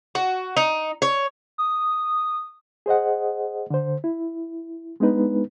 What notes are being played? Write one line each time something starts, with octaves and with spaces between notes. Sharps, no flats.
F#4
D#4
C#5
D#6
G#4 C5 D#5 F#5
D3 C5
E4
G#3 B3 D4 D#4 B4